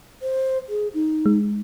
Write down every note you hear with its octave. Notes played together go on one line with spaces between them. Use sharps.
C5
G#4
D#4
G#3